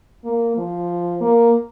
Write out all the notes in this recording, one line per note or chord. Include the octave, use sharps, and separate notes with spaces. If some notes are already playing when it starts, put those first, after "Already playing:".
A#3
F3
A#3